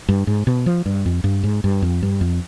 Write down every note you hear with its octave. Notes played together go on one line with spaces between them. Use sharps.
G2
G#2
B2
F3
G2
F2
G2
G#2
G2
F2
G2
F2